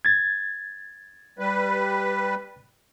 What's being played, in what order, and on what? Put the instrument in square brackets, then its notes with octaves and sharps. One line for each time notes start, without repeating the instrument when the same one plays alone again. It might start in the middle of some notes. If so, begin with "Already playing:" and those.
[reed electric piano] G#6 A6
[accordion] G3 B4